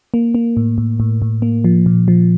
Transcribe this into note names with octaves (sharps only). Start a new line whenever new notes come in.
A#3
A#3
A2
A2
A2
A2
A#3
F3
A#2
F3